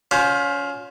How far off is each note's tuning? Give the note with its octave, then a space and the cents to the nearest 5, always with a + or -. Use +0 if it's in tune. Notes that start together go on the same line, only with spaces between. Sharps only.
C#4 +25 F4 +35 C5 +0